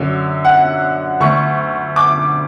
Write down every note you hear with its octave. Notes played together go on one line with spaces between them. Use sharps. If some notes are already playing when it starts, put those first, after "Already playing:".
Already playing: F#2 D3 F#3 C#4
F#5
D2 D3 A3 C#6
D6